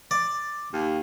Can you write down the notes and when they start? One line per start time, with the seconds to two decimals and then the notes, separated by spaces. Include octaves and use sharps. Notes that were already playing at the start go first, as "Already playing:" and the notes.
0.11 D5
0.73 D#2